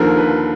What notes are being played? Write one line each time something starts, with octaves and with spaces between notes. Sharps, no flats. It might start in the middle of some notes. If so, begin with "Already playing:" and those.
Already playing: D#2 D3 F3 A#4
B4